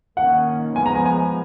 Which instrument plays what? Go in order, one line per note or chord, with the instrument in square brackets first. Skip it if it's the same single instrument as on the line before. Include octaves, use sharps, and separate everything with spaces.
[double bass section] D#3 A#3 C#4 [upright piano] F#5
[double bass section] B3 [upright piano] G#5
[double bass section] F3 G#3
[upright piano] A#5
G#5
G#5